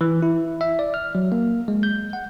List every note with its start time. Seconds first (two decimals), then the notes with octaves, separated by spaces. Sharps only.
0.01 E3
0.22 E4
0.61 E5
0.79 D5
0.94 F6
1.15 F#3
1.32 A#3
1.68 G#3
1.83 G6
2.13 F#5